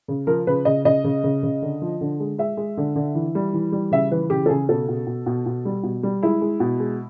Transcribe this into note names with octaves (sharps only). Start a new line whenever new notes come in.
C#3
F3 A#4
C#3 B4
C#3 D#5
C#3 D#5
C#3
C#3
C#3
D3
F3
D3
G#3
G#3 E5
G#3
D3
D3
E3
G3
E3
G3
C#3 E5
E3 B4
C#3 G4
A4
C#3 G#4
B2 A4
B2
B2
B2
B2
G3
B2
G3
G#3 E4
G#3
B2
G#3